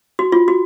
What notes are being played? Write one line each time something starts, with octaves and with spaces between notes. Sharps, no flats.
F#4
F4
F#4